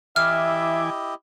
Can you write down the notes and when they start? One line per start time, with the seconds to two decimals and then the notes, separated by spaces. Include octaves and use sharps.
0.16 E3 E4 G4 D#5 E5 G#5 D6 F6